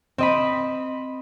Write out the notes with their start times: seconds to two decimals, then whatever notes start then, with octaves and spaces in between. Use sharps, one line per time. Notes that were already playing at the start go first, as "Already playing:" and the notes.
0.18 C4 D#5 B5